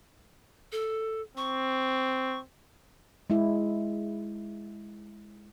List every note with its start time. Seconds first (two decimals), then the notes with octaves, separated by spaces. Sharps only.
0.72 A4
1.37 C4 C#6
3.30 G#3 E4